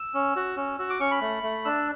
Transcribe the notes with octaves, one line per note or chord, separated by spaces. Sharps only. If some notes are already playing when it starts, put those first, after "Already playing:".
Already playing: E6
C#4
F#4
C#4
F#4 E6
D6
C#4 C#6
B5
A3
A3
D4 E6